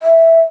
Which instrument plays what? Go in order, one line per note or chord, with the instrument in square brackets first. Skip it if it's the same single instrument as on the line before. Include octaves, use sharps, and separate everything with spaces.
[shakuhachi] E5